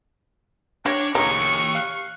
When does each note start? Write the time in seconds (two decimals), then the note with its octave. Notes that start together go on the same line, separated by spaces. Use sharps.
0.86 D4 G4 C#5 D6 G#6 A#6
1.15 D2 A#2 C#3 D#4 G4 C#5 C#6
1.75 F5 F#6